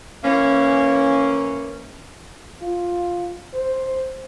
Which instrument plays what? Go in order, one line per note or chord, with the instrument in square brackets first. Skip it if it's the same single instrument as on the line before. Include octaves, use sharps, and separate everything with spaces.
[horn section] E3 A#3 C#4
[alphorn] F4
C5